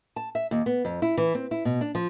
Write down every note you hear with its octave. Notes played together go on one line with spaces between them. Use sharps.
A5
E5
D#2
B3
F2
E4
E3
C4
E4
B2
D4
F3